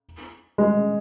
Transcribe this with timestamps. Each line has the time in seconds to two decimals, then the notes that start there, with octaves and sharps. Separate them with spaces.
0.58 G#3